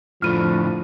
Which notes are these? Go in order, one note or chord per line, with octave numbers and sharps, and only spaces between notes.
F2 A2 D3 F3 F6 D#7